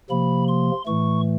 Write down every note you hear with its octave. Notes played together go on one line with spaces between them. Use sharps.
C3 F3 A#3 B5
C6
A2 E3 A3 C#6